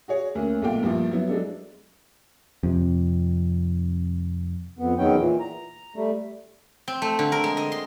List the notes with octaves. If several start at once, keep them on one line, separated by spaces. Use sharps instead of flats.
F#4 G#4 C#5
D2 A#3 C#4
B1 A#2 A3 F5 G5
G2 A#2 F3 E4
F#3 B3 E4
F#3 G#3 D4 A4
F2 C3
F2 B3
E2 D#3 F#3 B3 C#4 G5
A#2 E3
A#5
G3 A3
C4
A3
D3
A#4
G#3
D#5
C6